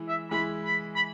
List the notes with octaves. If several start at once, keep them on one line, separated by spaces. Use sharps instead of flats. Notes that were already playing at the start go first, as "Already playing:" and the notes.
Already playing: E3 G#3 E4
E5
E3 G#3 E4 B5
B5
B5